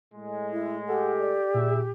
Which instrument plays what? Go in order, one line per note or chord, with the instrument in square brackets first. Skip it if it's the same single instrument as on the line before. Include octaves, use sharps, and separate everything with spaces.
[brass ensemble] A2 G#3
[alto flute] E4
[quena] G4 [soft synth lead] A4 [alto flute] F#5
[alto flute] D5
[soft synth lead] A#2 [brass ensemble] E4 G#4 E5